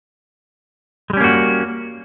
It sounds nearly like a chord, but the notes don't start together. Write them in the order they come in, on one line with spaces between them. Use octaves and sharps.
G#3 G3 C#4 A#3 F#4